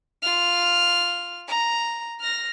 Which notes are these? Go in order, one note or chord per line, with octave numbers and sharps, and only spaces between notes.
F4 F6
A#5
F6 A#6